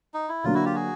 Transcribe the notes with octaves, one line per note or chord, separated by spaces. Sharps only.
D#4
E4
D3 F#3 A#3 D4 F4
E4 F#4
F4 G4
F#4 G#4